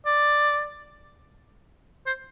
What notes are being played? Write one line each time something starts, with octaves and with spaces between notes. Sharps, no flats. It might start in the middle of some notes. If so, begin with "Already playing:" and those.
D5
C5